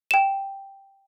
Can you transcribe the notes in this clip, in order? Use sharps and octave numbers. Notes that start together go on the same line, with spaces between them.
G5 E7